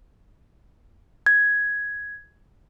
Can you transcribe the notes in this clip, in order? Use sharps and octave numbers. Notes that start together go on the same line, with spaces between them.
G#6